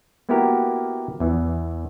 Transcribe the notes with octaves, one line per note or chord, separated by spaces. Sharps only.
A#3 B3 E4 F#4 G4 A#4
E2 E3